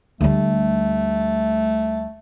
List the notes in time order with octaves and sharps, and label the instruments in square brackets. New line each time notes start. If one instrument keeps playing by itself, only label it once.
[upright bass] D2 G3 [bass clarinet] A3